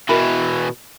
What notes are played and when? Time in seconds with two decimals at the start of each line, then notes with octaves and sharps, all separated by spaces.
0.09 B2 E3 F#4 A#4 B5